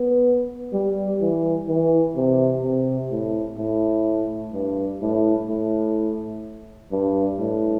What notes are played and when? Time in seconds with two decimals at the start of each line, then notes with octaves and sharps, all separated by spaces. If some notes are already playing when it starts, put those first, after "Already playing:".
Already playing: B3
0.73 G3
1.21 E3
1.68 E3
2.16 C3
2.63 C3
3.11 A2
3.58 A2
4.53 G2
5.01 A2
5.49 A2
6.92 G2
7.39 A2